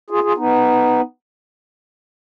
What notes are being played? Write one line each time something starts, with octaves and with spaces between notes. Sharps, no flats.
F4 G#4
F4 G#4
B3 D#4